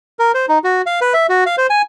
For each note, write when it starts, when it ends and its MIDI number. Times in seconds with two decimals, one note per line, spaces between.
0.19 0.32 70
0.34 0.46 72
0.49 0.58 63
0.64 0.82 66
0.86 1.00 77
1.01 1.13 71
1.14 1.26 76
1.29 1.44 66
1.46 1.56 77
1.58 1.67 72
1.70 1.82 80